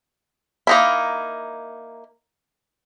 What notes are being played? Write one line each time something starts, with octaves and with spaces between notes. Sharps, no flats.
A#3 D#4 E4